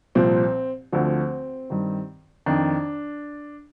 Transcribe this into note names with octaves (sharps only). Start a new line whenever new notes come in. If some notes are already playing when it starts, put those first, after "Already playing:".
C2 A#2 F3 C4
D2 D3 F3 C4
G2 D#3
F2 D#3 D4